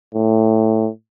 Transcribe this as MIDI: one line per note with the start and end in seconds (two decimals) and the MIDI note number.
0.15 0.89 45